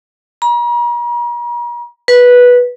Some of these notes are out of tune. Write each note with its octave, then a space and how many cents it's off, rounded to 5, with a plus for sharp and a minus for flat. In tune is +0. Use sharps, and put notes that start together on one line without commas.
A#5 +45
B4 -10